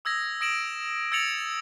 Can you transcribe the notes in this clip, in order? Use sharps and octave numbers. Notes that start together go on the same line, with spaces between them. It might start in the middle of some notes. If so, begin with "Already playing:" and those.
D#6 E6 G#6 A#6
D#6 A#6 D7 E7 F#7
E6 G#6 A6 C#7 F7 F#7